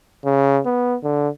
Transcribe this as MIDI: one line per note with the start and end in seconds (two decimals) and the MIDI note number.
0.25 0.61 49
0.66 0.96 59
1.03 1.28 50